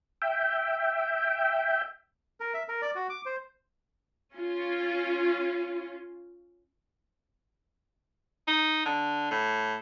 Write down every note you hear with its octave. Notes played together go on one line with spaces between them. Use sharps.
E5 G5
A#4
E5
A#4
D5
F#4
D6
C5
C#4 F4
D#4
D3
A2